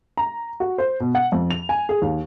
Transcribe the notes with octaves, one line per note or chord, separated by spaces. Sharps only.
A#5
F#4
C5
B2
F#5
F2
F7
G#5
G#4
D#2